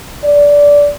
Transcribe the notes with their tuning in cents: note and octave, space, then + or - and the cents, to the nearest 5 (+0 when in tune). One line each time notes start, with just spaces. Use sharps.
D5 -15